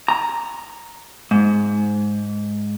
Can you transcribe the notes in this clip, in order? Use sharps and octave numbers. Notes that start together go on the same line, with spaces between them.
A#5
G#2